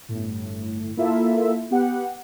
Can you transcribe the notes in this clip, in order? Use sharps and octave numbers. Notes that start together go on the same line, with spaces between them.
G1 A2
A#3 E4 F4 A4 E5
B3 G4 F#5